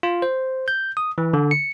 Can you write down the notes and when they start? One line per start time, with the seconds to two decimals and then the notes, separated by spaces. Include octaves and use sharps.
0.03 F4
0.22 C5
0.68 G6
0.97 D#6
1.18 E3
1.33 D3
1.51 C#7